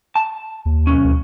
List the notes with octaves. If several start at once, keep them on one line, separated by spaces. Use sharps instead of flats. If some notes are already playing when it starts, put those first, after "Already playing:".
A5
D#2
B1 C#4
D2